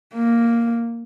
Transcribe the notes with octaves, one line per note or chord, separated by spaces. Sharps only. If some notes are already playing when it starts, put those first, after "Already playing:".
A#3